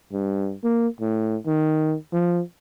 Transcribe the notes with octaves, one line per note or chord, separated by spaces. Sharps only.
G2
A#3
A2
D#3
F3